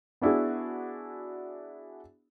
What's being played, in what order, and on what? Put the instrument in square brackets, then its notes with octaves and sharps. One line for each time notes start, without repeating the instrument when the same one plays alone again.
[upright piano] B3 D4 E4 F#4 G#4